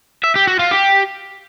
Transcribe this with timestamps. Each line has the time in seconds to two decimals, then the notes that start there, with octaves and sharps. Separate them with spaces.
0.24 E5
0.35 G4
0.47 F#4
0.59 F4
0.71 G4